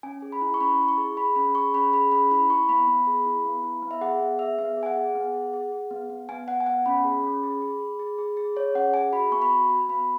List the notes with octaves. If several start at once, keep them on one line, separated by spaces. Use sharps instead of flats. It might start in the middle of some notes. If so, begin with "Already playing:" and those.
C#4 G#5
G#4
B5
E4
C#6
C#4 B5
E4
C#6
G#4
G#4 B5
C#4 B5
G#4 C#6
C#4 B5
G#4 B5
C#4 B5
E4 B5
E4 C#6
B3 B5
B3
G#4
E4
B3
E4
B3
E5
G#4 F#5
B3
G#4 E5
B3 E5
G#4
G#5
F#5
G#4
B3
G#4
G#4
G#4
B3
B3
B3 G#5
B3 F#5
G#5
B3 F#5
C#4 B5
G#4
C#4
G#4
G#4
G#4
G#4
G#4
G#4
G#4 C#5
C#4 F#5
G#4 G#5
F#4 B5
B3 C#6
B5
F#4
F#4
B3 B5